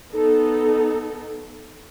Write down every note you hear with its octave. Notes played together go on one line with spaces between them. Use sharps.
B3 D#4 A4